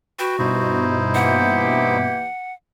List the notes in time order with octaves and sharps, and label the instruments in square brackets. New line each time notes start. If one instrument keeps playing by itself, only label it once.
[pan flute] F#4 [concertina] B4 G5
[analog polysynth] G2 B2 [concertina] D#4 E4 C5
[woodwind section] E3 A#3 G4 [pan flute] F#5